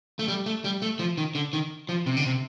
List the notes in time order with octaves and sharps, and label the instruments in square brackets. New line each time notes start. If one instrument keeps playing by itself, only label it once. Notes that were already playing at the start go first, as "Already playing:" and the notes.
[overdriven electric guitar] A3
G3
A3
G3
A3
F3
D#3
D3
D#3
F3
C3
D3
C3